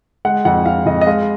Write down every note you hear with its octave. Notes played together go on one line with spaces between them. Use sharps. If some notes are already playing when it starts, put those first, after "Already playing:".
G#3 F#5
F2 F#5
F2 F5
F2 D#5
D#5
G#3 F5